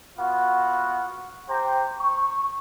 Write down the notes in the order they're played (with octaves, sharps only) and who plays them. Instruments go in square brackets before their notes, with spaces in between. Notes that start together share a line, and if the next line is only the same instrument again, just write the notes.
[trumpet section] B3 F4 F#4 F#5
G4 C5 G5 A#5
C#6